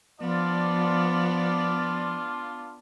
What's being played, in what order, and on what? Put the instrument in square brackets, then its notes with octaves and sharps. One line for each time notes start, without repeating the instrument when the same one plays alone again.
[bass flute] F3 [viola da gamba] B3 [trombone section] D4 F4 [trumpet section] D5